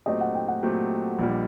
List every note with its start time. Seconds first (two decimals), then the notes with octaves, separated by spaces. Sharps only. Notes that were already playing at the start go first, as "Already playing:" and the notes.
0.06 A#2 F#3 A3 C4 G4 D#5
0.20 F#5
0.34 G5
0.48 F#5
0.62 A#2 F#3 A3 C4 G4
1.19 A#1 A#2 G3